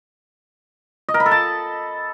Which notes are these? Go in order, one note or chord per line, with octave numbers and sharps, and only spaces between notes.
D#5
A#4
B5
A4
A5